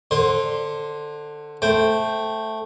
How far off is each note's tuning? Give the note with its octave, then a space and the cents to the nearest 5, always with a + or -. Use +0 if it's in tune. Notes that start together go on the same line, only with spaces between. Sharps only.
D3 +15 C5 +30 C6 +0
A3 +0 C5 +0 G5 +0